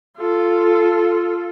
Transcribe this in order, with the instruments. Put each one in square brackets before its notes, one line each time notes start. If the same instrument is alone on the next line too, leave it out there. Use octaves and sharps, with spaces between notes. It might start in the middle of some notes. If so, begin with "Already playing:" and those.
[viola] F4 A4